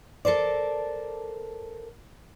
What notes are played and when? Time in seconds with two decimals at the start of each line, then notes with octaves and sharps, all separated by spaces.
0.25 A4 A#4 C5 D5